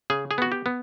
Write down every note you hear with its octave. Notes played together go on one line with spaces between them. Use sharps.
C#3 G#4
G#4
B3 F#4
G4
B3